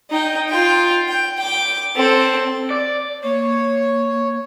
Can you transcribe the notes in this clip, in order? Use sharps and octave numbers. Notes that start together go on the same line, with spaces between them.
D#4 G5
F4 G5
G5
G5 D6
C4 A4
D5
A#3 C#5